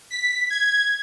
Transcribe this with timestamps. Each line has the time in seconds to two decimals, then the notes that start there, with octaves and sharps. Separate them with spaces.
0.11 B6
0.50 G#6